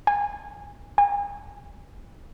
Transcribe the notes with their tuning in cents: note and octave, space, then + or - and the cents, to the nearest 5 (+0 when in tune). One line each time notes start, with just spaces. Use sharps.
G#5 -25
G#5 -40